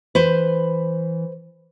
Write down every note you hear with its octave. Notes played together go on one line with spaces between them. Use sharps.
E3 B4 C5